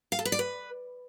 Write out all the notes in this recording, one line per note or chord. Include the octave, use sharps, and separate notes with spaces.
F5
A4
B4
D5
B4